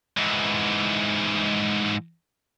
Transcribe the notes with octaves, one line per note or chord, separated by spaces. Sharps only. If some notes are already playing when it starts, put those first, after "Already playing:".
G#2 E3